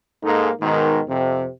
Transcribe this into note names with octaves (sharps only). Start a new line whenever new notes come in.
G#2 G#3 A#3 D#4 A4
G#2 B2 D#3
F2 C3